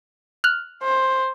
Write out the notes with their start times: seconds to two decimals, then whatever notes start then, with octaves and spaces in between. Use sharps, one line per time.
0.44 F6 F#6
0.83 C5